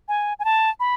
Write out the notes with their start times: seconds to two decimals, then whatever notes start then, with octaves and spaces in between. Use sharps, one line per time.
0.08 G#5
0.39 G#5
0.45 A5
0.80 B5